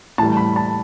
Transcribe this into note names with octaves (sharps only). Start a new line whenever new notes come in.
A2 E3 G3 A5
B5
A5